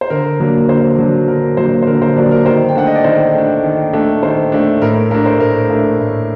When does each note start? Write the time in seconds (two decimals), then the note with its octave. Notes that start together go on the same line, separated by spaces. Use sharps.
0.01 C5
0.10 D3 A#4
0.40 F#3 A#3 D4
0.69 D3 C5
0.98 F#3 A#3 D4
1.28 D3 A#4
1.57 F#3 A#3 D4 C5
1.83 C5
1.87 D3 A#4
2.02 C5
2.16 F#3 A#3 D4 D5
2.31 A#4
2.46 D#3 C5
2.69 G5
2.75 A3 D4 F#5
2.87 D#5
2.96 D5
3.04 D#3 C5
3.34 A3 D4
3.64 D#3
3.93 A3 D4
4.22 D#3 C5
4.52 A3 D4
4.82 A2 A#4
5.11 A3 D4 A#4
5.26 C5
5.40 A2 A#4
5.70 A3 D4
5.99 A2